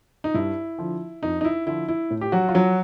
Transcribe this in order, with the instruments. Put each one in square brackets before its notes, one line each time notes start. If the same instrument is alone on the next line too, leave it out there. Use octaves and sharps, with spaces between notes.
[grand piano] D#4
G2 E4
D3 F3
F2 D#4
D#4
E4
D3 F3 E4
E4
A2
G4
F#3 F#4
F4
F3 F#3 F#4